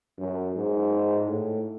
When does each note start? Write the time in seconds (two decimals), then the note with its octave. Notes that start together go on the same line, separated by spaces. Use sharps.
0.18 F#2
0.55 G#2
1.28 A2